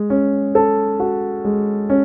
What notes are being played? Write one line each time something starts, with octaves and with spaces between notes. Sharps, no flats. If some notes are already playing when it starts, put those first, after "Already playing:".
Already playing: G#3
C#4
A4
F#4
G#3
C#4